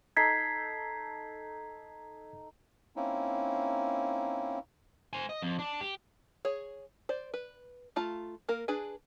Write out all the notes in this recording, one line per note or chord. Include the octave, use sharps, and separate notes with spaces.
D#4 A4 G#6 B6 C7
A#3 C4 C#4 D#4 E4
C5 G#5
D#5
F2
D4
G4
G#4 C#5
C5 D5
B4
A3 F4 A5 A#5
A#3 A#4
D4 G#4 B4 G#5